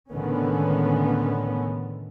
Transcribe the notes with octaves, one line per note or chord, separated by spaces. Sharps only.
C#2 A2 D3 D#3 B3 C#4